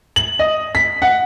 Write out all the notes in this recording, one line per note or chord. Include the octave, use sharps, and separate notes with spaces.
F#7
D#5
B6
F#5